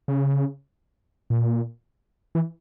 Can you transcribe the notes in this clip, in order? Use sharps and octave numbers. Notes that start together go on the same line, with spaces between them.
C#3
A#2
E3